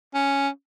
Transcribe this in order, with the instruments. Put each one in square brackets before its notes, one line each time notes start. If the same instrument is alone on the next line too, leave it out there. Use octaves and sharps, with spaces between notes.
[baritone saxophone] C#4